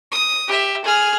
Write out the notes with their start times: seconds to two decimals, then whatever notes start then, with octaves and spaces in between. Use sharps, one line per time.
0.12 D#6
0.48 G4 E5
0.84 G#4 F6